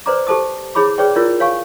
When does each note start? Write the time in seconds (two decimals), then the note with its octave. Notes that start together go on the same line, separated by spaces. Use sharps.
0.06 B4 C5 D5 A#5 D6
0.27 G4 A4 C5 A5 D6 D#6
0.75 E4 G#4 C#5 B5 D6
0.98 G#4 B4 C#5 D5 G5
1.15 E4 F4 A#4 C#5 D5
1.40 C#5 F5 G#5 C#6